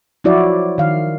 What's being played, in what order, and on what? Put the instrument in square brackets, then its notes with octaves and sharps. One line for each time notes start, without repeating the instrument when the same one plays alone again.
[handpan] F3 F#3 E4 F#4 D5
D#3 F5